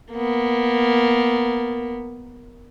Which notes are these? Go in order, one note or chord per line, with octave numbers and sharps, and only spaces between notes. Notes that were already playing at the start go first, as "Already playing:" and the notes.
A#3 B3